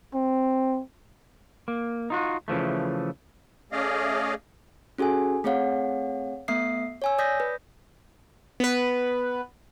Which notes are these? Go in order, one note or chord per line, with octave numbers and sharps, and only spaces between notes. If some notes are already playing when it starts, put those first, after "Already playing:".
C4
A#3
D#4 F4 F#4
C#3 E3 F3 A3
A3 C#4 G#4 D5 D#5 F5
C#4 F#4 G#4 A4 G#5
A3 C4 G#4 C#5 F5 F#5
A3 B3 E5 D#6 C7
C#5 G#5 E6
D5 D#6 G6 A#6 B6
B4
B3 B4